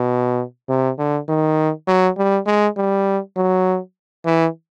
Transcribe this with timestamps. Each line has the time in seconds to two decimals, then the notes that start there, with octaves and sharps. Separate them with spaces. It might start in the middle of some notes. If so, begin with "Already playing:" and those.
Already playing: B2
0.69 C3
0.98 D3
1.29 D#3
1.88 F#3
2.18 G3
2.47 G#3
2.77 G3
3.37 F#3
4.26 E3